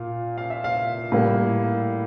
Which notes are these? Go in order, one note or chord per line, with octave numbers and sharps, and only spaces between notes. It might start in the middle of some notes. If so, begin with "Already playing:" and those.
Already playing: A#2 F5
F5
E5
F5
A2 G3 A#3